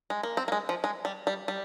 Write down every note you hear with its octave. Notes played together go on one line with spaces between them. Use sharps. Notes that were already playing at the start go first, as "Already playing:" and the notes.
G#3
A#3
C4
A#3
G#3
F3
G#3
G3
G3
G3